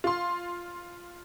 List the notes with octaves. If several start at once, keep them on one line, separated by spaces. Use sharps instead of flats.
F4 C6